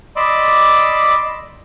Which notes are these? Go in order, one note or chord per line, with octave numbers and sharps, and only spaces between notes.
D5 D#5 B5 C6 D6 E6